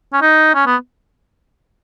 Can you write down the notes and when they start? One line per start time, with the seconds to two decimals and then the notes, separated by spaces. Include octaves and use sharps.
0.13 C#4
0.22 D#4
0.55 C#4
0.66 B3